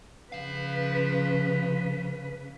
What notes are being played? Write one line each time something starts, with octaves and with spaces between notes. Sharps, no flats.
C#3 F3 B4 F5